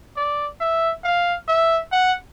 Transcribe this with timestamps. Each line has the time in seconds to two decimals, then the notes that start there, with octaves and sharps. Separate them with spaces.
0.16 D5
0.60 E5
1.04 F5
1.48 E5
1.92 F#5